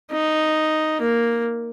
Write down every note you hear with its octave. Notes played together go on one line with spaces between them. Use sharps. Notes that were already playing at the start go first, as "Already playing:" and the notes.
D#4
A#3